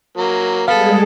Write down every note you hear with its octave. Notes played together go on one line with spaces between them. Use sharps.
F#3 A#3
G3 G#3 B3 G#4 A4 F5